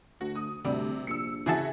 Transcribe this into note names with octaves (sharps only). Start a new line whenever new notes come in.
D2 F#4
D#6
D2 C3 G3
A#1 E6 C#7
C#3 E3 F#4 G#4 A4 E5